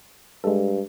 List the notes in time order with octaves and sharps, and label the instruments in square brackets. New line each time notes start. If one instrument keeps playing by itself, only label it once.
[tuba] G2 [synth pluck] G#3 A4